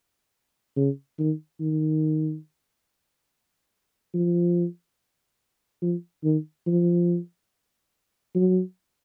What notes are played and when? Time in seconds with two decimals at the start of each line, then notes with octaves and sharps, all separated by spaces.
0.76 C#3
1.19 D#3
1.61 D#3
4.14 F3
5.82 F3
6.24 D#3
6.67 F3
8.35 F#3